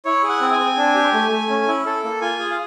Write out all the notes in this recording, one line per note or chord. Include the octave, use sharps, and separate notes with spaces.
E4 C#5
G#4
F#5
C4
G#5
C4
D4
G4
A3
A3
C#4
E4
A4
A#3
F4 G#5
G#4
F5